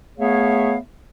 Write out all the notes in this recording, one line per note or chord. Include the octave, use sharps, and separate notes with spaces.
A3 B3 G#4 C#5 E5 F5